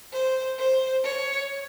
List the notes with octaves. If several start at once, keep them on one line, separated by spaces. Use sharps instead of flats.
C5
C5
C#5